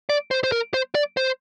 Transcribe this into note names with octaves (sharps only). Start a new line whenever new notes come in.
D5
C5
C5
A#4
C5
D5
C5